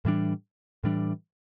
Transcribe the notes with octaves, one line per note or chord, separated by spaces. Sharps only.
A2 E3 G3 D4
A2 E3 G3 D4